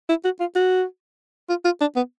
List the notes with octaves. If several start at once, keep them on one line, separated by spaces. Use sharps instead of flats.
E4
F#4
F4
F#4
F4
F4
D4
B3